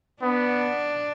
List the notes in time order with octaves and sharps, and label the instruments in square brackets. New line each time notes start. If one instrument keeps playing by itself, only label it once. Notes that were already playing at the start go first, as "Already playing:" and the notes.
[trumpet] B3 [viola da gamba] D4